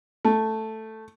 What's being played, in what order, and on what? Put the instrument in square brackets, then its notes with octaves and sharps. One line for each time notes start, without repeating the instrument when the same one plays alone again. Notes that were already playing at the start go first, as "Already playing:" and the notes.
[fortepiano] A3